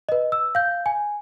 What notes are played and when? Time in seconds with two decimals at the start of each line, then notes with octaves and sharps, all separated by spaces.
0.09 B4 D#5
0.32 E6
0.55 F5 G6
0.86 G#5